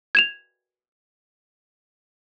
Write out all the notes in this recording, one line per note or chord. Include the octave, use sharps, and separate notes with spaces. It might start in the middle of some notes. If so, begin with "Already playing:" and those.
G#6 E7 F7